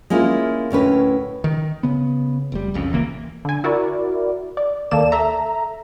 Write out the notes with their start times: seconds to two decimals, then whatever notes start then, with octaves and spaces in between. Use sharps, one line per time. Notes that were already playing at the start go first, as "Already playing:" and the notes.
0.10 G#3 A#3 C#4 E4 F4
0.70 D2 A2 C#4 B4
1.44 D#3
1.83 C#3 B3
2.52 F1 G3
2.74 F1 C2 F2 C#3
2.90 E1 C#2 E3 A#3
3.45 D3 G#5
3.64 E4 F#4 A#4 D5
4.57 D5
4.91 D#2 D#3 A#3 A4 D5 E7
5.12 A4 E5 A#5